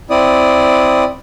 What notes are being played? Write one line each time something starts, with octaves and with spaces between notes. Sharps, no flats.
C4 E4 D5 D#6